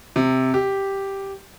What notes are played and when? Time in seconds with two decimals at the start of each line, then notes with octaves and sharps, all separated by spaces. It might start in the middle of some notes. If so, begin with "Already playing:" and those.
0.16 C3
0.54 G4